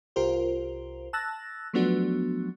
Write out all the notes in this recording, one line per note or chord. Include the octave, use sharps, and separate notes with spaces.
C2 F4 G4 A#4 C5
A5 E6 F#6 A6 A#6
F3 F#3 A3 B3 D4 F#4